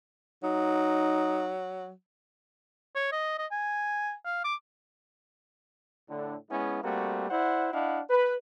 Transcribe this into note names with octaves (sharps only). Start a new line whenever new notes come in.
F#3 D#4
C#5
D#5
D#5
G#5
F5
D6
A2 D3
G#3 B3 C#4 E4
G3 A3 A#3 C4 F#4
E4 C5 D5 F#5
D4 E4 D#5 F5 F#5
B4